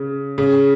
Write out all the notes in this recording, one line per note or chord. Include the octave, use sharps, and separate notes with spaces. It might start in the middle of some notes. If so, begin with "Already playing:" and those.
Already playing: C#3
C#3